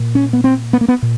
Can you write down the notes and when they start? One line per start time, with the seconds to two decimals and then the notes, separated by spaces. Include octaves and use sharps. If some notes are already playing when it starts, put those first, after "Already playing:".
Already playing: A#2
0.15 C#4
0.33 B3
0.44 C4
0.73 B3
0.81 A#3
0.88 B3
1.02 A#2